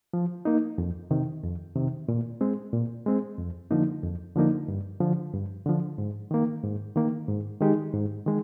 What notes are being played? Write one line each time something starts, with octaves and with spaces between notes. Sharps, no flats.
F3
A#3 D#4
F2
C3 D#3
F2
C3 D#3
A#2
G#3 C4
A#2
G#3 C4
F2
D3 F3 A#3 D#4
F2
D3 F3 A#3 D#4
G2
D3 F3
G2
D3 F3
G#2
D#3 A#3
G#2
D#3 A#3
G#2
D#3 G#3 D#4 G4
G#2
D#3 G#3